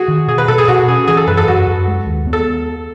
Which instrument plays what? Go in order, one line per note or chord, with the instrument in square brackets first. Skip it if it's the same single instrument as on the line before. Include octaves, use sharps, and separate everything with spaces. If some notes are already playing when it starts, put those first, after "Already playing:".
Already playing: [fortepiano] F#4 G#4
[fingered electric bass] D#3
[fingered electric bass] B2 [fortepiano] G#4
[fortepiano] B4
[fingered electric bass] B2 [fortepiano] A4
[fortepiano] G#4
[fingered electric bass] B2 [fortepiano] F#4
[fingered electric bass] C#4 [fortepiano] G#4
[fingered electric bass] E3 [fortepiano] G#4
[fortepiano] A4
[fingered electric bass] F#2 [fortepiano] B4
[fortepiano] A4
[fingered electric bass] F#2 [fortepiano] F#4
[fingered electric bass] F#2
G#3
D#2
B3
[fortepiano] A4